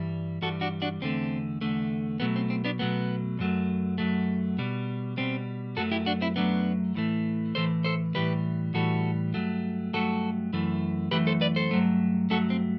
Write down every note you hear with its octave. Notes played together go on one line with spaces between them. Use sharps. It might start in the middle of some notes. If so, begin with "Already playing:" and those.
Already playing: G2 E3 G3
G2 E3 G3 F#4 A4
D4 F#4
D4 F#4
E2 D3 A3 C4
E2 D3 A3
B2 F#3 A3 B3
C4
C4
B3 D4
B2 F#3 A3 B3
F#2 F#3 A3
F#2 F#3 A3
B2 G3
B2 G3 C4
F#2 F#3 A3 F#4 A4
E4 G4
D4 F#4
C4 E4
F#2 F#3 A3 B3 D4
A2 E3 A3
A2 E3 A3 A4 C5
A4 C5
A2 E3 G3 G4 B4
A2 E3 G3 F#4 A4
G2 F#3 A3
G2 F#3 A3 F#4 A4
F#2 E3 A3
F#2 E3 A3 G4 B4
A4 C5
B4 D5
A4 C5
G2 F#3 A3
G2 F#3 A3 F#4 A4
C4